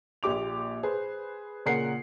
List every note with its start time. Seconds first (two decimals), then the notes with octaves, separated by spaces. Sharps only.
0.23 A#1 A#2 G4 D6 F7
0.83 G#4 B4 C5
1.66 A#2 C#3 A#4 F#5 C7 C#7